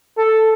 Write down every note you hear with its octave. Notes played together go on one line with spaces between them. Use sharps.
A4